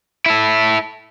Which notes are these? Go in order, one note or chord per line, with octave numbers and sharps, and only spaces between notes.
E4 A4